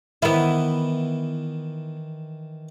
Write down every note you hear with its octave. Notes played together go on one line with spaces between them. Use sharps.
D#3 E3 B3 E4